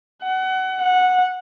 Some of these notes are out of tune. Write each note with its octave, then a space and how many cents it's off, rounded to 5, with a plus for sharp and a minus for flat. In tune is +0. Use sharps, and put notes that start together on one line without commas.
F#5 +25
F#5 -10